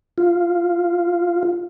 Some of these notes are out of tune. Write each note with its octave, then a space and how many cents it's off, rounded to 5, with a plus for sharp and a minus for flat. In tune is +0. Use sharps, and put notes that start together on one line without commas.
F4 -5